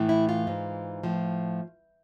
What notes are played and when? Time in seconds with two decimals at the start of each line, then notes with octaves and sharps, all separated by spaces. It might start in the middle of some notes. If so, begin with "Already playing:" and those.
Already playing: A2 E3
0.09 E4
0.29 F4
0.47 G#2 E3
1.03 A2 F3